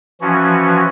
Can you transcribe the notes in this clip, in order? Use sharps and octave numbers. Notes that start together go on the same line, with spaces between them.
E3 F3 C#4 F#4